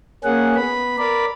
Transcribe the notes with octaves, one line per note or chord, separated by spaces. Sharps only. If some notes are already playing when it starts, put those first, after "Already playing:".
A#3 C#4 G#4 F#5
B3 B5
A#4 D5 B5